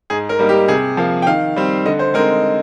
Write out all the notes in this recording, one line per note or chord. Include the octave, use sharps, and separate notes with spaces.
G#2 G#4
A#4
G3 A#3 D#4
G4
C3 G#4
F3 A#3 F5
G5
D#3 F5
G3 C4
D3 D#5
C5
G#3 C4 D#4 A#4